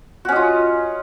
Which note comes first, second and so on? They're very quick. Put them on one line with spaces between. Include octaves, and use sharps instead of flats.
F#4 C#4 D#5 F4